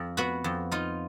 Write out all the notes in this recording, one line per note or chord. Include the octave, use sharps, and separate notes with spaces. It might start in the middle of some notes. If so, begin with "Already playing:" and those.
Already playing: F2
B3 F#4
F2
D#4 F4